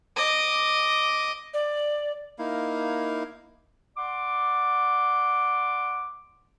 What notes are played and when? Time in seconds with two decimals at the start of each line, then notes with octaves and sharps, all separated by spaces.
0.16 D#5 D6
1.54 D5
2.39 A#3 D#4 E4 F5
3.96 D5 F#5 C6 D6